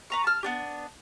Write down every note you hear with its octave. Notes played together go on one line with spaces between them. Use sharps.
B4 A#5 C#6
A5 F6
B3 D4 G4